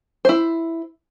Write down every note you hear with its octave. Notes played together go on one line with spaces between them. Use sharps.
E4 C5